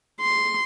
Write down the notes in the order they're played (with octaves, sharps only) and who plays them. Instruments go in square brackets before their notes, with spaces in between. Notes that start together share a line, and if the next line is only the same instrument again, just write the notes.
[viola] C6